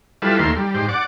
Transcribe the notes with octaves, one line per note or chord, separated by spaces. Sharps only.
G3 E4 F4 A4 B4
D#2 A3 A#3 C6
G3
G#2 G4 C5
D5 F#5 D6